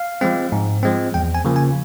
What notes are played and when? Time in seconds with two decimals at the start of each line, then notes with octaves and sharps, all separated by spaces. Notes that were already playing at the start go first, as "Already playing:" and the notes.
Already playing: F5
0.21 F3 G#3 C4
0.52 G#2
0.83 F3 G#3 C4
1.14 E2 G5
1.35 G#5
1.45 C#3 F3 A#3
1.56 G#5